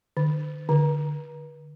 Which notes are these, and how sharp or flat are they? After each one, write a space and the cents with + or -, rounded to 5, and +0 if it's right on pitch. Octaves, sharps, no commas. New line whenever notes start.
D3 +45
D3 +10